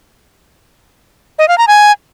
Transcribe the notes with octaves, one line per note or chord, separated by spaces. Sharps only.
D#5
F5
A#5
G#5